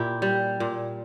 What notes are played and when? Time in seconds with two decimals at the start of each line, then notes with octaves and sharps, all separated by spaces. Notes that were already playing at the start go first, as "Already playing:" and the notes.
Already playing: A#2 E4 G4
0.22 G3
0.60 A#2